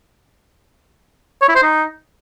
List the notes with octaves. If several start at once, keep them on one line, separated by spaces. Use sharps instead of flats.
C#5
E4
C5
D#4